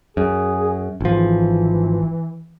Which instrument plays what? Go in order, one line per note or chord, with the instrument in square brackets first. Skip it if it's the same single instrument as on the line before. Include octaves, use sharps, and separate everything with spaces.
[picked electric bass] F#2 [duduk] G#4
[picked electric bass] G#1 F3 [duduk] E3